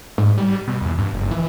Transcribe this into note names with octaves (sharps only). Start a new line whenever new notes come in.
G#2
G3
B2
E2
G2
F#1
E3